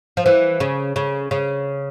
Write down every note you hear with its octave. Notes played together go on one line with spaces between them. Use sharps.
F3
E3
C#3
C#3
C#3